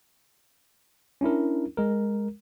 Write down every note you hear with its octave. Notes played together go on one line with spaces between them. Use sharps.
C#4 D4 E4 A#4
G#3 A#4